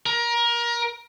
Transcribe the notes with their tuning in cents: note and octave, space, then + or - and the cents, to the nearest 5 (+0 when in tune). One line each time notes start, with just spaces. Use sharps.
A#4 +25